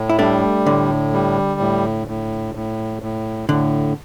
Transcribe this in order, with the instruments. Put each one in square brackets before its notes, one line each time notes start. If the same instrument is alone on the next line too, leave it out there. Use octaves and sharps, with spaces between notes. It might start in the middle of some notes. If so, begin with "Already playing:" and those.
Already playing: [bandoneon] A2
[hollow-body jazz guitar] E4
[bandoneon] G3 [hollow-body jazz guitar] A3 D4
[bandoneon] A2 [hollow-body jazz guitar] D3
[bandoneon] G3
A2
A2
A2
A2
[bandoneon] A2 [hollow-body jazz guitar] D3